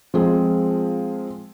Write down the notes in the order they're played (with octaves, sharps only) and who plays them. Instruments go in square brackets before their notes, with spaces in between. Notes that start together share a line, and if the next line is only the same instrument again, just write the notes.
[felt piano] F3 G#3 C4 G#4